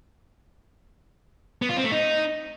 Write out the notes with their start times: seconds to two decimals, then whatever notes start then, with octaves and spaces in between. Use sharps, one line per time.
1.62 B3
1.69 F4
1.77 C4
1.84 A3
1.92 D#4